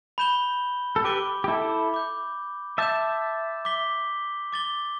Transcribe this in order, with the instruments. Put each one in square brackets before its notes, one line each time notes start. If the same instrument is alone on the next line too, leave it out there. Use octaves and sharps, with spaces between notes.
[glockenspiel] B5 G6 E7 G7
[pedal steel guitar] A4
[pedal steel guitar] G4 B4 [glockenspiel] D6 G6 D7 G7
[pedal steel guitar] G4
E4 A4
[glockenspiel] B5 D6 G6
[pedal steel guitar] E5 A5 [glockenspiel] D6 G6 E7
[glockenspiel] D6 B6 G7
D6 A6 G7